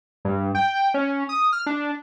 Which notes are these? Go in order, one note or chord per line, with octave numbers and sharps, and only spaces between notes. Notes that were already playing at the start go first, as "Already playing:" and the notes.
G2
G5
C#4
D#6
F6
D4